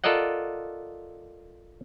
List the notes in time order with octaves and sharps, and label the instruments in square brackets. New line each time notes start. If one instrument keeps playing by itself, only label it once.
[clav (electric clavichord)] F4 A4 A#4 D5 D#5 F#5